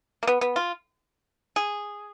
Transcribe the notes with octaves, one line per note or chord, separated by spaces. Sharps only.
A#3
B3
B3
F4
G#4